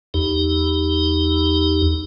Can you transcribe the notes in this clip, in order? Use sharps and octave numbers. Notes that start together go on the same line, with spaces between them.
E2 D#4 G4